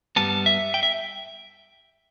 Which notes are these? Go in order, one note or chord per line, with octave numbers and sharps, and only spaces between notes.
G2 G3 B3 A5
E5
G5
E5